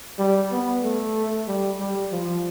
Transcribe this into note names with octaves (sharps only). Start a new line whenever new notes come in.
G3
B3
A3
G3
G3
F3